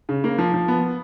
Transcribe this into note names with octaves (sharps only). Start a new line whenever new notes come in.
C#3
A#3
F3
F3
B3